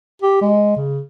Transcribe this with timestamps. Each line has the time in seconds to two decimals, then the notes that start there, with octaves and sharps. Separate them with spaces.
0.22 G4
0.42 G#3
0.76 C#3